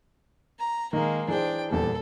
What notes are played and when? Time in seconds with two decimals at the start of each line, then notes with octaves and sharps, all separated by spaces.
0.59 A#5
0.93 D#3 G#3 A#3 D#5
1.28 E3 D4 G#4 C5 G5
1.71 D#1 E2 G3 A4